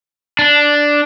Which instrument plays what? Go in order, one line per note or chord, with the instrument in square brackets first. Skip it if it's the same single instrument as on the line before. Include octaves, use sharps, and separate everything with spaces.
[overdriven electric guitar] D4